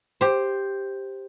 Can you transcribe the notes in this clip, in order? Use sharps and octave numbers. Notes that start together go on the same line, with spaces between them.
G4 C5